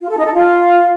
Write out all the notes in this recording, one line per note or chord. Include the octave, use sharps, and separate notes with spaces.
F4
A4
D#4
A4
F4